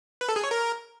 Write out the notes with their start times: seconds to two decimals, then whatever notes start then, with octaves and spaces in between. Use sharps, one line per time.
0.21 B4
0.29 A4
0.36 G#4
0.44 C#5
0.51 A#4